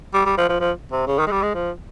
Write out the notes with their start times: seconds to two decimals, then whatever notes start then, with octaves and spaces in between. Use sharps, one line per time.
0.14 G3
0.25 G3
0.38 F3
0.49 F3
0.60 F3
0.92 C3
1.07 C#3
1.19 D#3
1.27 G#3
1.31 G3
1.42 G#3
1.54 F3